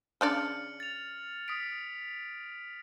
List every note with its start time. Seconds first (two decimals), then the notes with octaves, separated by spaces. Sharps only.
0.21 C#3 D4 D5 F6 C#7 F#7
0.80 A6 F7
1.48 D#6 B6 D7